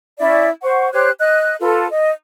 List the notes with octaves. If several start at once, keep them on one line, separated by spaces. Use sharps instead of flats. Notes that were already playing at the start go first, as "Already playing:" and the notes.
C#4 E4 D5 E5
C5 F#5 C#6
G4 C5 C#5 F#6
D#5 F#6
F4 A4 B4
D#5